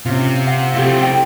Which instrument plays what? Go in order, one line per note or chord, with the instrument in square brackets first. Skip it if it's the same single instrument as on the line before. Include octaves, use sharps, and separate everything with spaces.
[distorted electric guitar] C3 [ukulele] C#4 F4
[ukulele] F5 F#5
[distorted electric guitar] A3 C4 [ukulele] E4 F4 G4
[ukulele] G5